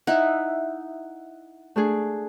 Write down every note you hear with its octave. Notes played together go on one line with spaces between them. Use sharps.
D#4 E4 E5 F#5
A3 D4 G#4